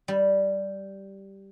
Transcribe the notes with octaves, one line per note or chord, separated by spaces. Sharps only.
G3